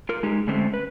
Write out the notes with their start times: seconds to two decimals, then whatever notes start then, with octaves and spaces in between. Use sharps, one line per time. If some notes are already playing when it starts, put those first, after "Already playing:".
0.09 F4 A#4
0.23 G#3 D#4 G4 G#4
0.47 D3 G#3 A3 C4 C#4
0.74 B4